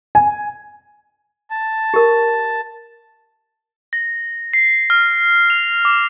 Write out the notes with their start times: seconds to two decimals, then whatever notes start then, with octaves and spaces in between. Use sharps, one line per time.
0.15 G#5
1.51 A5
1.94 G4 A#4
3.93 A#6
4.53 C7
4.90 F6
5.50 F7
5.85 D6